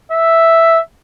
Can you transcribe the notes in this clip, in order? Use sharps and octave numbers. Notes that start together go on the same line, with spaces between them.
E5